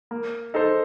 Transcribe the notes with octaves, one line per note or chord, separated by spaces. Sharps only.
A#3
D#4 A4 C5